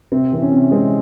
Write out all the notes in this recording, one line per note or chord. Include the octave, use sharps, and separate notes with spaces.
C3 C4
E3 C4
C#4
C3
G#3 C4